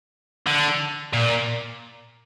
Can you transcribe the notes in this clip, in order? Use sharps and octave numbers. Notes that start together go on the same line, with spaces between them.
D3
A#2